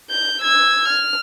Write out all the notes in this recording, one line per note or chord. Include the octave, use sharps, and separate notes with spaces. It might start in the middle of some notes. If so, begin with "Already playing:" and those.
G6
E6 G#6
F6